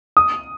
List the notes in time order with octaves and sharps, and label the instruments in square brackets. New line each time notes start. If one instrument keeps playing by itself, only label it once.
[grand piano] D#6